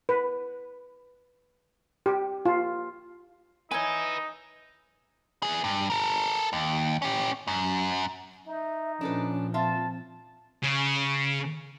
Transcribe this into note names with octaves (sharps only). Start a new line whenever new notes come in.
B4
G4
F4
D#4 B4 C#5 E5 G#5
E3 G#4
G2
A4 A#4
D#2
C#4 G4
F#2
D#4 E5
A#2 F3 C#4 D4 A4 B4
C4 F4 E5 A5
C#3